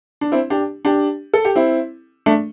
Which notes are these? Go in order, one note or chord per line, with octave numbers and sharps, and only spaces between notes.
D4
C4 E4
D4 G4
D4 G4
A4
G4
C4 E4
A3 D4